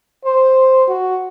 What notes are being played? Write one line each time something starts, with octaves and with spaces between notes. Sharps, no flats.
C5
F#4